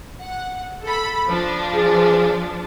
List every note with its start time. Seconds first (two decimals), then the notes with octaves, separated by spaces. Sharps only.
0.20 F#5
0.83 A4 B5
1.28 F3 D4
1.75 G#4